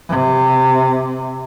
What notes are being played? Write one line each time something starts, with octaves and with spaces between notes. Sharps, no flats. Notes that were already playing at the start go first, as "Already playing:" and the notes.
C3